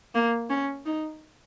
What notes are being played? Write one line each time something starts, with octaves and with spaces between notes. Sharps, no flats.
A#3
C#4
D#4